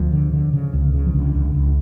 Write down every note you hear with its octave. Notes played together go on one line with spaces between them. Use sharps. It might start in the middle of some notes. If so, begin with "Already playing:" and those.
Already playing: D2 F3
D3
D3
C#3
C#2
C#3
F3
C#2 D3
C#2
C#2